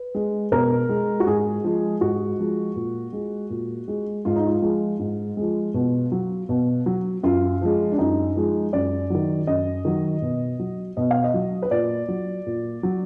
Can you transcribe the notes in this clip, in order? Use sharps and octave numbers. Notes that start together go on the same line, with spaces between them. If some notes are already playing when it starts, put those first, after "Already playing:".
Already playing: B4
G#3
B2 A#4
G#3
F#4
G#2 G#4
F3 G#3
G#2 F#4
F3 G#3
A#2
G#3
A#2
G#3
G#2 F4
D#4
F4
F3 G#3
G#2
F3 G#3
B2
F#3
B2
F#3
F#2 F4
F3 G#3
D4
F#2 D#4
F3 G#3
F#2 D5
D#3 F#3
F#2 D#5
D#3 F#3
B2
F#3
B2 D#5
F5
D#5
F#3
B4
A#2 D5
F#3
A#2
F#3